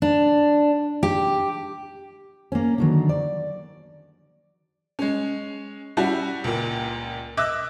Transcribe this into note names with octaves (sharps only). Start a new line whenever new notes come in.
D4
G4
A#3 C#4
D3 D#3 F#3
D5
G#3 C#4
G3 C#4 E4 F#4
C#2 A#2
D#5 E5 D6 E6 F#6